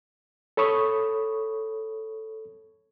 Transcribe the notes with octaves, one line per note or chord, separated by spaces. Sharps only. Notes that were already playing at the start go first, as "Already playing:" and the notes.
A4 C#5 B5 C#6 D#6